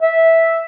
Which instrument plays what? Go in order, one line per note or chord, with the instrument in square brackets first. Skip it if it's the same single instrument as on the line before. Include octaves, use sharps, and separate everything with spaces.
[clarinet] E5